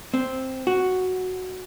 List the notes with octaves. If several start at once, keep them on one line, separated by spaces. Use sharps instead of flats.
C4
F#4